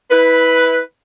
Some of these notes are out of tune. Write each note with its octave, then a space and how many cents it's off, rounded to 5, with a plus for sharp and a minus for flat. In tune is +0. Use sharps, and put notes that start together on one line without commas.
E4 -25 B4 +0